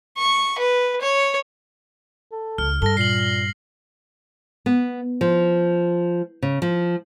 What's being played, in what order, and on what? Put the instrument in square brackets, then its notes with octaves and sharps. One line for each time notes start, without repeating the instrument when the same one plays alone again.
[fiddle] C#6
B4
C#5
[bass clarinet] A4
[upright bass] C#2 [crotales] F6
[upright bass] G2 [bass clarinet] A4 [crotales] A#6 G7
[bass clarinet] A#2 [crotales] C7 F#7
[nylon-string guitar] B3
F3
C#3
F3